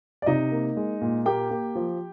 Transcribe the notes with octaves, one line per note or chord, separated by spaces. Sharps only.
D5
C3 D#4 D#5
A#3
G#3
A#2
A#3 G4 G5
A#3
F3